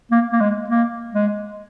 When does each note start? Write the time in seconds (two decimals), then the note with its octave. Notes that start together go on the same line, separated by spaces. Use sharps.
0.11 A#3
0.32 A#3
0.40 G#3
0.69 A#3
1.13 G#3